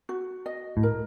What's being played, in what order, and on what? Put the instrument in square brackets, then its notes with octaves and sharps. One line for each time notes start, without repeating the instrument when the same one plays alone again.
[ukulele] F#4
D#5
[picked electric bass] A2
[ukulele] A#4